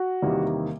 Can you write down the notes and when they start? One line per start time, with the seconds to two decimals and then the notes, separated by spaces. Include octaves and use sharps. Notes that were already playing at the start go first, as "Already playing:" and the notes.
Already playing: F#4
0.22 E2 C3 D#3 G3 A#3